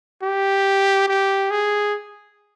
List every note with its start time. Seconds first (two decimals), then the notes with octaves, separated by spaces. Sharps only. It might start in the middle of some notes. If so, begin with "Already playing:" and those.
0.23 G4
1.08 G4
1.50 G#4